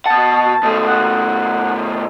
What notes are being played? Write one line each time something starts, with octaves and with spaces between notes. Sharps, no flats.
B2 F#5 A5
B2 A3
F#5